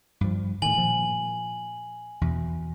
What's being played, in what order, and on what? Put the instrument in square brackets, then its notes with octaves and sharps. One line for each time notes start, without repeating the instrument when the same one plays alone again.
[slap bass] G2 F3
[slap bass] A2 D#3 [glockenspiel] G#5 F#7
[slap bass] A#2 F3
E2 B2